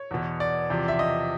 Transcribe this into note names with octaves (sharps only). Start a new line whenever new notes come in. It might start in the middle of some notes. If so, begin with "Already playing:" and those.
Already playing: C#5
E2 B2
D5
E2 C3 F3
E5
D#5